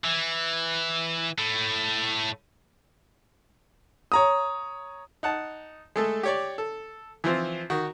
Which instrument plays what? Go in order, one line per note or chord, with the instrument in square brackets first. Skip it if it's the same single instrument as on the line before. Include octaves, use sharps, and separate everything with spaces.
[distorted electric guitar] E3
A2 A3
[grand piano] C#5 A#5 D#6
[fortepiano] D#4 F#5 A5
G#3 A3 A4
G4 C#5 D5
A4
E3 F3 C4 F4
D#3 F#4